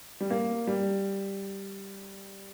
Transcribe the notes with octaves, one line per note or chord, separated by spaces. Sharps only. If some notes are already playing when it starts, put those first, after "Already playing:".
G3
A#3
G3